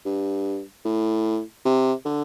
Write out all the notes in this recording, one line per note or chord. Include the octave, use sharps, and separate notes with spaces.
G2
A2
C3
D3